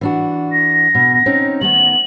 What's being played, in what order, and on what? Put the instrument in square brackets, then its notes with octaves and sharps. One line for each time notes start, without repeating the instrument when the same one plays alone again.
[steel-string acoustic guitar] E3 D4 F#4
[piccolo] A#6
[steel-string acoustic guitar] B2
C4 C#4 D#4
[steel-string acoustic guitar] D#3 A3 B3 [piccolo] F#7